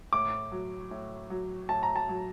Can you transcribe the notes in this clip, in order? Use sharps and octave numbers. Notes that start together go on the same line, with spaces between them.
A2 D6
F#3
A2
F#3
A2 A5
A#5
A5
F#3